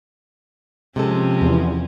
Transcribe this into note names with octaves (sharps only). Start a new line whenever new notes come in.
C3 F3 G#3 C4 C#4 A4
E2